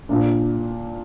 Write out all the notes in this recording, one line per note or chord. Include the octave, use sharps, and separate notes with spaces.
A#2 A#3 D4